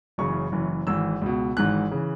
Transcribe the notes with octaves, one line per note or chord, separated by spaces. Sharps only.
F#1 F#2 C#3 E3 C#6
F#1 F#2 E3
G#1 G#2 E3 E6
C#2 B2
G#1 G#2 E3 F#6
C#3 E3